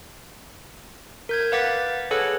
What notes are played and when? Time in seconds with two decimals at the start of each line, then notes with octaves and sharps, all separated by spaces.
1.29 A#4 G6 G#6
1.52 B4 F5 F#5 D6 A6 B6
2.11 G#4 A4 B4 C#5 F#5